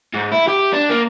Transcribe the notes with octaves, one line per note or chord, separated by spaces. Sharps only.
G#2
E4
G4
D4
A#3